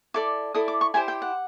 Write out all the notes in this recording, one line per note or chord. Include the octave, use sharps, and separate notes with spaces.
E4 A4 D5 D6
E4 A4 D5 D#6
D6
C#6
E4 G4 C5 G#5
G5
F#5